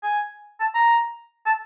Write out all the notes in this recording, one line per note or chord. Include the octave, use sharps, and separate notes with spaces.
G#5
A5
A#5
A5